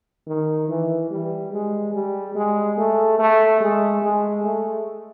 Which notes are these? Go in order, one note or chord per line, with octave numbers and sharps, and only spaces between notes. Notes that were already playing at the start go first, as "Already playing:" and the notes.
D#3
E3
G3
G#3
G3
G#3
A3
A3
G#3
G#3
A3